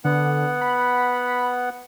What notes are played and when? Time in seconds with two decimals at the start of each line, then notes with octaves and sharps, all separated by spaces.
0.05 D3 B3 F#5
0.61 B5